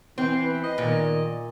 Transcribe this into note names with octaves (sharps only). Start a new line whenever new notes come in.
E3 C4
B4
D#5
A#2 D#3